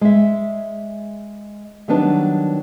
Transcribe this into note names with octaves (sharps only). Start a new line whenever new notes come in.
G#3 E5
D#3 F#3 G3 B3 D4 D#4